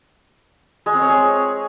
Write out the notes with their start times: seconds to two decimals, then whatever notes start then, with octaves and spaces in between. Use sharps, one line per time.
0.86 G#3
0.94 C4
1.01 C#5
1.09 G#4